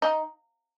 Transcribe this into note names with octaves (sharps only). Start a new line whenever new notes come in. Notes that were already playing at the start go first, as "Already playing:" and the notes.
D#4